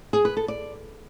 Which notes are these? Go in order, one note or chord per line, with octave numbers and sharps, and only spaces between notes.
G#4
B4
A4
D5